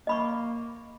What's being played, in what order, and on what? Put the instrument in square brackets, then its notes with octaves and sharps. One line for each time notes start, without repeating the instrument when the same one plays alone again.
[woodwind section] A#3 [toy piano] D#5 B5 C#6